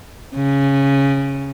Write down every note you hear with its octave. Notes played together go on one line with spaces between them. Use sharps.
C#3